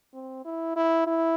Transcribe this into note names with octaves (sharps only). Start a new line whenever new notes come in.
C4
E4
E4
E4